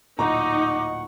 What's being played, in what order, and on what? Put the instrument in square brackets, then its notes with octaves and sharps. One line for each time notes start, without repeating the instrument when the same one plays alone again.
[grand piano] D1 A#2 A#5 [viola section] D#4 [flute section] F#5 C#6 [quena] D6